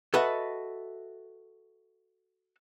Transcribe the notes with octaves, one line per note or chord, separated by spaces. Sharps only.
F#4 A4 B4 D#5 E5 F#5